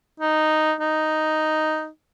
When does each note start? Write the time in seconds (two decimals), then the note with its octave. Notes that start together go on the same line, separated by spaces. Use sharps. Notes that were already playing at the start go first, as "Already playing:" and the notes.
0.20 D#4
0.80 D#4